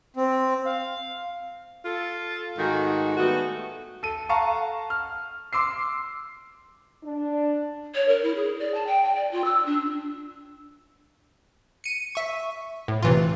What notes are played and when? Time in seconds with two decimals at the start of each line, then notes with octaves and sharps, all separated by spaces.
0.16 C4
0.66 F5
1.85 F4 A4
2.59 G#2 D#3 A3 F#4
3.17 G3 A3 B3 F#4
4.03 A4 D#7
4.29 F5 F#5 A5 A#5 C#6
4.90 F6
5.53 C6 D6 E6 C7
7.04 D4
7.94 C#5
8.08 A#4
8.23 E4
8.34 G#4
8.59 D5
8.74 A5
8.86 G5
9.03 G5
9.15 D5
9.31 F4
9.44 E6
9.65 D4
11.84 C#7 D#7
12.15 E5 C#6
12.88 A2
13.03 C3 E3 F4